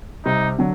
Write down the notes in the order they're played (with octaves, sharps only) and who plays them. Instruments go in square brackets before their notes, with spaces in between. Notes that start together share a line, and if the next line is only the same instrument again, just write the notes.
[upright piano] C3 G3 C4 [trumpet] D#4
[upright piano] D3 F#3